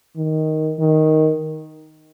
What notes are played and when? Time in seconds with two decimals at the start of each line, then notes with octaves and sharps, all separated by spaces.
0.17 D#3
0.79 D#3